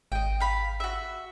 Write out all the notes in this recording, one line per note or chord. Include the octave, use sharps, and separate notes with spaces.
G#1 D#5 G5
F5 B5
F#4 E5